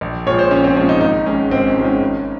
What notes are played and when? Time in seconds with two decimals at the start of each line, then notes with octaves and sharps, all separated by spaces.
0.01 A#1
0.26 A#2 F3 G#3 C#5
0.39 C5
0.51 A#1 C#4
0.64 C4
0.76 A#2 F3 G#3 C#4
0.89 D#4
1.01 G#1 D#4
1.26 G#2 D#3 G#3 C#4
1.51 G#1 C4
1.67 C#4
1.75 G#2 D#3 G#3
1.84 C#4
2.01 G#1